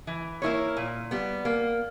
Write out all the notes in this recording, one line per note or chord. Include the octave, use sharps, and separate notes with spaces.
E3
A#3 E4 A#4 C#5
A#2
G3 B3
A#3